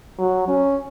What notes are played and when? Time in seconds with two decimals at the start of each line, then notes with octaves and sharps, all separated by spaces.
0.18 F#3
0.48 C#4